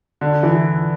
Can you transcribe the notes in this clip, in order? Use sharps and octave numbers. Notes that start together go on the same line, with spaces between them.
D3
E3